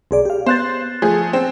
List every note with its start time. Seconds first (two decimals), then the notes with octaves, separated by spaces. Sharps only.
0.11 B1 G#4 D5
0.25 G4 F5
0.46 B3 C5 F#6 A6
1.02 F3 A3 G#4
1.33 C4